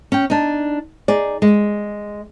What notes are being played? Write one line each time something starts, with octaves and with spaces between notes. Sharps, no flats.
C#4 G5
D4 D#4
D#4 G#4 D5
G#3